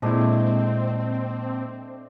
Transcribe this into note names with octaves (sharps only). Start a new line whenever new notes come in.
A#2 G#3 A3 C4 D4 E4 D#5